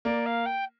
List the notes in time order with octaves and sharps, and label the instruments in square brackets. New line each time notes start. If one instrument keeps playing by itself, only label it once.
[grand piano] A#3 [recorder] D5
[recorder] F5
G5